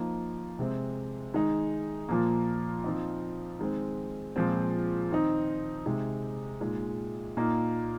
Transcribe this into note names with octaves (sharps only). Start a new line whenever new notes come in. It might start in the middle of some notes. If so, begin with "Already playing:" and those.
Already playing: F3 A#3 D#4
C3 G#3 C4
D#3 G#3 D#4
A#2 F3 A#3
F3 C4 D#4
D#3 G#3 C4
A#2 F3 G#3 C4
D#3 C4 D#4
C3 G#3 D#4
A#2 G#3 D#4
A#2 A#3 D#4